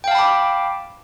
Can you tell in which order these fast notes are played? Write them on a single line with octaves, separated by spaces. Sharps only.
G5 F5 A5 B5 D6